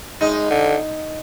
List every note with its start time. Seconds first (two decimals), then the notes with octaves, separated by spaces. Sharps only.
0.21 G#3 D#4
0.51 D3